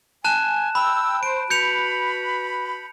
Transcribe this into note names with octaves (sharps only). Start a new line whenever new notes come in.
G#5 A5 F#6 E7
G5 B5 E6
C5 D7
F#4 B4 B5 G6 C#7 F7